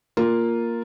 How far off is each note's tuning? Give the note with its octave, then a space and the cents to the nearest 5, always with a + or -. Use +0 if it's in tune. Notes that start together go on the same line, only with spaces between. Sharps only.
A#3 +0 F4 +0